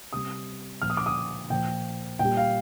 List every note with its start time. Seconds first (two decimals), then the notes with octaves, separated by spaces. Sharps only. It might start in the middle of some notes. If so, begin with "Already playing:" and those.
0.13 C3 G3 D#6
0.82 A#2 F3 F6
0.90 D#6
0.97 D6
1.06 D#6
1.50 A#2 F3 G5
2.19 A#2 G3 G5
2.37 F5